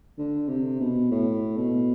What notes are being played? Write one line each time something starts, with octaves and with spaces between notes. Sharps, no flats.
D3
C3
B2
A2
B2